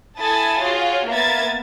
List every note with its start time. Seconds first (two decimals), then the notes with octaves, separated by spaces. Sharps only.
0.19 E4 A4 G#5 A5 D#6 A6
0.63 F4 F#4 G#4 C#5
1.09 A#3 B3 A#4 E5 G#6 A6